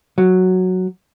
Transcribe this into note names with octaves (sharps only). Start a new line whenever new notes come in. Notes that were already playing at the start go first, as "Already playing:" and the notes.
F#3